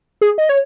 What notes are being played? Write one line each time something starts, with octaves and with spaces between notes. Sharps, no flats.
G#4
D#5
C#5